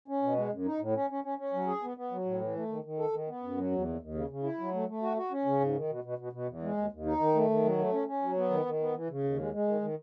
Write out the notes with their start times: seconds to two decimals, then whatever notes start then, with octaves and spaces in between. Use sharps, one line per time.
0.08 C#4
0.23 B2
0.36 G#3
0.52 F#2
0.66 D#4
0.80 A2
0.95 C#4
1.10 C#4
1.24 C#4
1.38 C#4
1.53 F#3
1.67 G#4
1.83 B3
1.97 B3
2.11 F#3
2.25 A2
2.41 E3
2.56 A3
2.69 D#3
2.84 D#3
2.99 A4
3.13 D#3
3.28 B3
3.43 F#2
3.57 F#3
3.71 E2
3.85 D#2
4.00 D#2
4.14 C#3
4.30 C#3
4.43 E4
4.59 F#3
4.74 A3
4.88 A3
5.02 F#4
5.17 F#4
5.31 C#4
5.45 C#3
5.60 G#2
5.75 D#3
5.89 B2
6.04 B2
6.18 B2
6.33 B2
6.48 E2
6.62 G#3
6.77 D#2
6.92 D#2
7.06 D#4
7.20 D#3
7.35 A3
7.50 D#3
7.64 F#3
7.78 A3
7.92 C#4
8.08 C#4
8.22 F#3
8.36 B3
8.50 D#3
8.65 D#3
8.81 B3
8.94 E3
9.10 C#3
9.24 D#2
9.39 G#3
9.53 G#3
9.68 D#3
9.81 D#3